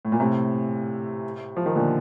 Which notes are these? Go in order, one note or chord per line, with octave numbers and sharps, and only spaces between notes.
A2
A#2
A2 C3
F3
D#3
A#2 D3